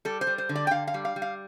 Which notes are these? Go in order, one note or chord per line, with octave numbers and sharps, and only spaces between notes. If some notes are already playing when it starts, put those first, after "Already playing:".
G3 A4
C5
G3
C5
D3
D5
G5
D3 F5
F5
G3
F5
G3
F5